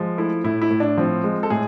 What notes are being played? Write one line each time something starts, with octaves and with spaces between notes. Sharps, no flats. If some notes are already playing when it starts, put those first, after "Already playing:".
Already playing: F3 G#3
A3 E4
A2 E4
E4
A2
D4
F3 C4
G#3
A4
A2 G#4